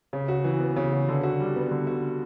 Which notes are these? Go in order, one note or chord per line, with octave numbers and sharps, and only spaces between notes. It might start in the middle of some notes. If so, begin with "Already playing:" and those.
C#3
F#4
E3
B3
C#3
F#4
D3
F#4
G3
B3
D3
F#4